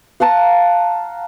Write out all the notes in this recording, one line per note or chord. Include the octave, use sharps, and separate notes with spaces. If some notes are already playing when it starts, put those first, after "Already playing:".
F5 F#5 A5 A#5